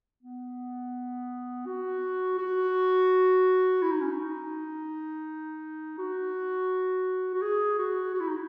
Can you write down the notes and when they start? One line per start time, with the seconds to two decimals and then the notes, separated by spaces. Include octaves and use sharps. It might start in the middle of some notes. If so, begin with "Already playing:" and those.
0.23 B3
1.66 F#4
2.38 F#4
3.82 E4
3.92 D#4
4.02 C#4
4.11 D#4
5.98 F#4
7.34 F#4
7.42 G#4
7.79 F#4
8.14 F#4
8.20 E4
8.28 D#4